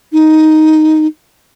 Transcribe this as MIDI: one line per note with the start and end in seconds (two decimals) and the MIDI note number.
0.13 1.07 63